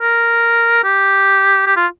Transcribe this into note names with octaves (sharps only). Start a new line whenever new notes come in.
A#4
G4
G4
F4